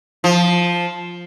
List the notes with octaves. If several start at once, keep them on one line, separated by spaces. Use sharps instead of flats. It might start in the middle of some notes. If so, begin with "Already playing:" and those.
F3